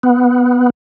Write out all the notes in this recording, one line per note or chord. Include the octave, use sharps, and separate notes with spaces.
B3